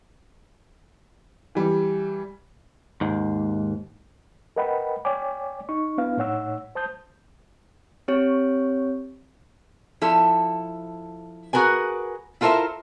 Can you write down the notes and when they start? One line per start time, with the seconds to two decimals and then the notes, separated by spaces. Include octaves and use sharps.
1.55 E3 G3
3.01 D#2 G#2
4.56 A#4 B4 D#5 F#5 G5 B5
5.05 C#5 D5 G5 G#5 D6
5.69 D#4 C#6
5.98 B3 D4 E4 B4 F5
6.17 A2 D#4 C#5 F#5 E6
6.75 C5 A5 D#6 G6
8.08 C4 G4 C#5
10.01 F3 E4 A4
11.53 F#4 G#4 A#4 B4 G#5
12.41 E4 F4 A4 A#4 C5 E5